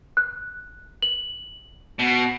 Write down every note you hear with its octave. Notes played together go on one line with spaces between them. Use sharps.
F#6
F#7
B2